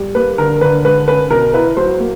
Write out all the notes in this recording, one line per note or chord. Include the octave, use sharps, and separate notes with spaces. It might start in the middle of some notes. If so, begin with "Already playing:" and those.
Already playing: G3
A#3 B4
D3 A#4
D3 B4
G#3 B4
C#4 B4
B2 A#4
E4 B4
F#3 C5
A#3